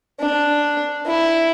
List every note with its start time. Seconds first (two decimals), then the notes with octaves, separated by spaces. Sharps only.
0.20 D4
1.06 E4